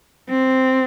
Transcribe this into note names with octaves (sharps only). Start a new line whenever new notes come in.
C4